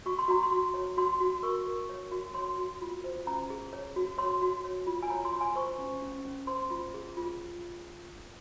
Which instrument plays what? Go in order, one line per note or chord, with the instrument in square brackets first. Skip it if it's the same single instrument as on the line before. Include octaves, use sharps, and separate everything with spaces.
[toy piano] F#4 C#6
C6
F#4 A#5
C6
F#4
C#5
F#4 C6
F#4
A#4 C#6
A#4
C#5
F#4
C#5 C6
F#4
F4
C5
C#4 A#5
G#4
C#5
F#4
C#5 C6
F#4
C#5
F4
G#5
C#5 A#5
C6
C#5
G#5
C5 C#6
C#4
C#4
C#4
C5 C6
F4
G#4
F4